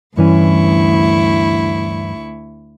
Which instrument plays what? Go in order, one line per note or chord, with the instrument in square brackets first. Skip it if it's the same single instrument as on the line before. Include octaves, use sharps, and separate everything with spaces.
[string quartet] D2 E4 C#6 [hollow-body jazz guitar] G2 E3 C#4